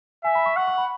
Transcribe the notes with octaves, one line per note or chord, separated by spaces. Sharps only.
E5 G#5
B5
C#6
F#5 C#6
C#6
B5